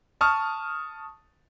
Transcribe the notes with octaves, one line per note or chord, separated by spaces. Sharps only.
A5 C#6 D#6 F6